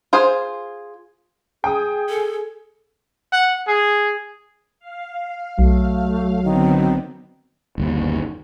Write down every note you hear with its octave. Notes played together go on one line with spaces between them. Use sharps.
F4 G#4 C5
G#4 G5 D#6
A4
F#5
G#4
F5
B1 F#3 A3
D3 D#3 B3 C4
G1 D#2